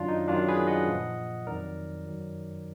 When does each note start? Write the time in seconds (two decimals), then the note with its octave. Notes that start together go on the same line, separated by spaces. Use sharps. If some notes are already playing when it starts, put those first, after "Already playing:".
Already playing: F#2 D#3 F#3 D4 F4
0.08 D#4
0.28 F#2 D#3 F#3 D4 F4
0.48 G#4 B4
0.67 D#5 F#5
0.88 A#2 F3
1.47 F2 D#3 F#3 A#4 D5
2.06 F#2 D#3 F#3